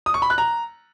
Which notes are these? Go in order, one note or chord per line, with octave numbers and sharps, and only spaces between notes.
D#6
C#6
B5
F#6
A#5